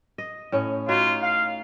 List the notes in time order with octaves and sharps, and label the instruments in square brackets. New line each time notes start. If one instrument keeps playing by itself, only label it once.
[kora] D#5
A2 C#4
[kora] D#4 F#4 [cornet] F4
[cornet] F5